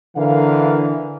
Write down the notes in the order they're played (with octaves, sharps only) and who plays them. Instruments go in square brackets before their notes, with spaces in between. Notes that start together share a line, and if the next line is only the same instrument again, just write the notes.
[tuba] D3 [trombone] E3 [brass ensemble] A#4 F5